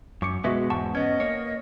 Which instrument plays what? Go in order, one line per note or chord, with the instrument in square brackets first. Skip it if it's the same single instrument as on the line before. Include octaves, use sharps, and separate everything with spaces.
[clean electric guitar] F#2 [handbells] C#6 D6 C#7
[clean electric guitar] B2 G#3 B3 [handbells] F#4 D#5 E5
[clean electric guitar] E2 G#2 [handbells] F#5 A5 C#6
[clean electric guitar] B3 C#4 [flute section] D#5 [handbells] G#6
[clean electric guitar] A#3 C#5